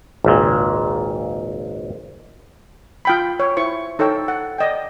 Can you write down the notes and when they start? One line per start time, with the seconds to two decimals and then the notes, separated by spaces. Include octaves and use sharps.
0.24 G#1 C#2 A#2
3.05 F4 G5 B5
3.40 C#5
3.57 E4 C5 C#6
3.99 D#4 A4 C#5 G5 E6
4.28 F#5
4.58 D5 D#5 G5